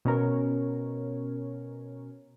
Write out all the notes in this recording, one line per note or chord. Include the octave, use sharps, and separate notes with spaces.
B2 C#4 A#4 C#5